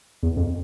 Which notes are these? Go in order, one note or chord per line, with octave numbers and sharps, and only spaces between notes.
E2
F2